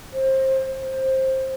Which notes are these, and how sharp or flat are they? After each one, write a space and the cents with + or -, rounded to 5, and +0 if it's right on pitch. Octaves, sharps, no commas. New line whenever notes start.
C5 +25
C5 +15